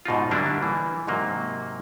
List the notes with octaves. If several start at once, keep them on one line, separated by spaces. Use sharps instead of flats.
G#2 B2 D#4 F4
D3 F#3 G3 A#3 D4 E4
E3
G#2 C3 F#3 A#3